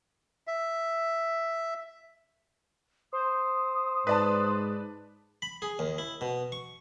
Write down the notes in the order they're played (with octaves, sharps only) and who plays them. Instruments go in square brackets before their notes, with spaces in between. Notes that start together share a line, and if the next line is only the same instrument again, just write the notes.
[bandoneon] E5
[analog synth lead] C5 [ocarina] D#6
[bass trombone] G#2 [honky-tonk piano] B4 D5 A5
[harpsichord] B5
G#4
D#2
E4
B2
C#6